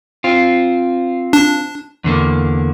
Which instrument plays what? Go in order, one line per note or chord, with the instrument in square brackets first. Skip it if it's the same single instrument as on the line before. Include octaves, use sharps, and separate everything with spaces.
[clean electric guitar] C4 F4
[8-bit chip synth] D4
[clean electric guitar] E2 D3 A#3